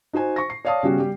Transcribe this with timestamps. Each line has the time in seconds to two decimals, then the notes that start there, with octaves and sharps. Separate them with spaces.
0.13 D#4 F#4 C5 G#5
0.36 C#6 A#6
0.50 C7
0.65 C#5 D5 F5 A5 D#6
0.83 C#3 G3 B3 C#4 F#4 G4
0.99 G3 G4